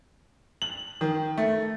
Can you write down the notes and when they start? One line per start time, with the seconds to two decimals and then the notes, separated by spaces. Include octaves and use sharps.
0.62 F#7
1.01 D#3
1.38 A3